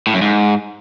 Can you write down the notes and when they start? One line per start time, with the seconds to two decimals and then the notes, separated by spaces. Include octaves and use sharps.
0.07 A2
0.14 F#2
0.21 G#2